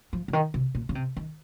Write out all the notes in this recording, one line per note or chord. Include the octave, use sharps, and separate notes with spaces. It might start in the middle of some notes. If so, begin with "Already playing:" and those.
F3
C#3
D#3
C3
A#2
C#3
C3
D#3